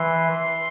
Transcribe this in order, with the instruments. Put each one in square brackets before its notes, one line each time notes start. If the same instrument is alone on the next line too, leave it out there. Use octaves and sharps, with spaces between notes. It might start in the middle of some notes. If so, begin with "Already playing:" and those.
Already playing: [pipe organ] E3 [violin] C6
[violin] C6